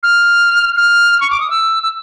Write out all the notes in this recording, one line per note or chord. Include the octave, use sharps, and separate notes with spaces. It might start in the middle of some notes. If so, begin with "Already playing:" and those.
F6
F6
C#6
D6
D#6
E6
E6